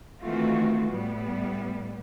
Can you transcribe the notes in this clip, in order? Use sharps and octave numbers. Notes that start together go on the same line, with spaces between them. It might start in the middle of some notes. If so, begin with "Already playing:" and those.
D#3 E3 A3 C4 F4 F#4
A2 G3 B3